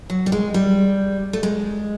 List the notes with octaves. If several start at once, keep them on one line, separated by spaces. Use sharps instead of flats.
F#3
G3
G#3
G3
A3
G#3